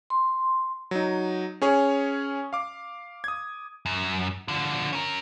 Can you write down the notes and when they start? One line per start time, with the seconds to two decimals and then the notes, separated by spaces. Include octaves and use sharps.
0.10 C6
0.91 F#3 D#4
1.62 C#4 G#4 C#5
2.53 F5 D6
3.24 D#6 G#6
3.86 F#2
4.48 D3 F3
4.93 C#4 A#4